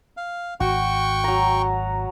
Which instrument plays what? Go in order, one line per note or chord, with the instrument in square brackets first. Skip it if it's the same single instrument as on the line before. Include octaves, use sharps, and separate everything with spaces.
[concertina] F5
[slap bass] G#1 [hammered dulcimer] F#4 [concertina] G5 C#6
[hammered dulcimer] F#3 A#5